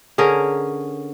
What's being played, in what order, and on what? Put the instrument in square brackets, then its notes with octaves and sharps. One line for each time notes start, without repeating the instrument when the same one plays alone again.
[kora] D3 C#4 G#4 A#4